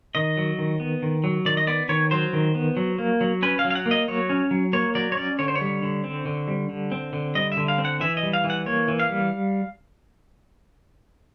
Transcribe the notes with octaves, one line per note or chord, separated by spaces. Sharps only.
D#3 D#5
F#3
D#3
B3
D#3
F#3
D#3 D5
D#5
B3 D5
D#3 C#5
F#3 C5
D#3
B3
F#3
A#3
F#3
C#4 B4
F5
F#3
F5
F#5
A#3
D#5
F#3 C#5
C#4
F#3
A#3 C#5
F#3 D5
C#5
C#4 D5
D3 C#5
C5
C#5
G3
D3
C4
D3
G3
D3
C4
D3
G3 D#5
E5
D3
F5
C4
F#5
E3 E5
D#5
G3
F5
E3
F#5
A#3 C#5
E3
F5
G3